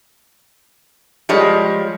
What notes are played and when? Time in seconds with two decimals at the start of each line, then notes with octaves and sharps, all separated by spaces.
1.29 F3 G3 G#3 C#5